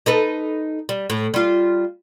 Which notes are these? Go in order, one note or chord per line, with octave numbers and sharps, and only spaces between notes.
D#4 A4 B4
G3
A2
G3 F4